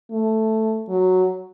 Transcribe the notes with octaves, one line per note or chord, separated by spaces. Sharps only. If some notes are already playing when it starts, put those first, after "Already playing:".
A3
F#3